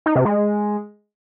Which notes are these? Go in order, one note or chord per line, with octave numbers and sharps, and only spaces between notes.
D#4
C3
G#3